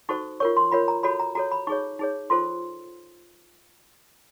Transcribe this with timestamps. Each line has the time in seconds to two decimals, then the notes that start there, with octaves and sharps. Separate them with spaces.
0.09 D#4 F#4 A4 C5 C#6
0.40 F4 A#4 C#5 C#6
0.57 C6
0.72 F4 A#4 C#5 B5
0.88 A#5
1.03 F#4 A4 C#5 B5
1.20 A#5
1.35 F#4 A4 C#5 A#5
1.52 B5
1.67 D#4 G#4 C#5 C#6
1.99 D#4 G#4 C#5
2.30 F4 A4 C5 C6